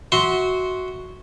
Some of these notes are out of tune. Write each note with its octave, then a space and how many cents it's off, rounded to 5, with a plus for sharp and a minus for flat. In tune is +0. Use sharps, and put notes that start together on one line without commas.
F#4 +0 E5 -25 C6 +0